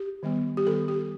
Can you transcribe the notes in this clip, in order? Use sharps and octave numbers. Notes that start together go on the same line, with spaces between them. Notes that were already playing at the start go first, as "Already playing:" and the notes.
Already playing: G4
D#3 G3 B3
G4
D#3 G3 B3 A4
G4